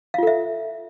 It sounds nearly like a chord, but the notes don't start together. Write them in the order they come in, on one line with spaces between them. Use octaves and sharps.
F5 F4 A4 E5